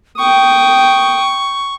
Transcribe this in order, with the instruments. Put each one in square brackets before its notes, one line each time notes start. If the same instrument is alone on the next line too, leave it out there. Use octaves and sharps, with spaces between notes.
[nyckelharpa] G5 D#6 [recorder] C#6